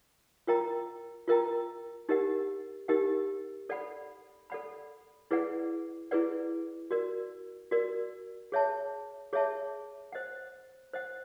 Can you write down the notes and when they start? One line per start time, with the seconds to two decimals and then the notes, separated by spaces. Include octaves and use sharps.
0.47 F4 A#4 D#5 G5 A#5
1.28 F4 A#4 D#5 G5 A#5
2.09 D#4 G4 A#4 D#5 F#5
2.88 D#4 G4 A#4 D#5 F#5
3.69 A4 D5 F#5 B5
4.50 A4 D5 F#5 B5
5.31 E4 G#4 B4 D5 F#5
6.11 E4 G#4 B4 D5 F#5
6.91 F#4 A#4 D5
7.71 F#4 A#4 D5
8.52 G#4 C#5 E5 A5
9.33 G#4 C#5 E5 A5
10.12 C5 D#5 F#5
10.93 C5 D#5 F#5